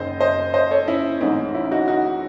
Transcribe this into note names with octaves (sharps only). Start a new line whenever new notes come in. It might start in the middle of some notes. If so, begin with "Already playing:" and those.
Already playing: F#1 F#2 D#3 C5 D#5
C5 D#5
C5 D#5
A4 C#5
C#4 E4
A1 G#2 E3 C4 D#4
C#4 E4
D#4 F#4
D#4 F#4